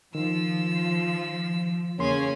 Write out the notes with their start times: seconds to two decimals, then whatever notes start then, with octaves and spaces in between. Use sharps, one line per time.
0.15 D#3 F3 E6
1.98 E2 C#3 A#3 C#4 G#4 C#5 G#5 C6